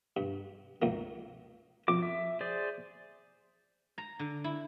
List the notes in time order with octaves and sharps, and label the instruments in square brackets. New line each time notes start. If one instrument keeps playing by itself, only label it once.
[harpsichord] G2
C#2 G#2 A#3
[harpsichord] F2 [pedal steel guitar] D6
[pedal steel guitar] E5
G#4 C5 D5
[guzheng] A#5
D3
E4